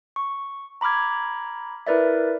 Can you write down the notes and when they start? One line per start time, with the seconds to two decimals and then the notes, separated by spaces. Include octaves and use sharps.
0.16 C#6
0.81 A#5 B5 D6 F6 G#6
1.87 E4 A#4 B4 D5 E5